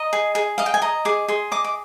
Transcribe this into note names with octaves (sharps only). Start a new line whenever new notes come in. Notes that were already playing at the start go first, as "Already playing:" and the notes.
Already playing: D#5 A#5
G#4
G#4
D#5 F5
G5
G#5
D#5 A#5
G#4 D6
G#4 C6
D#5 D6
D6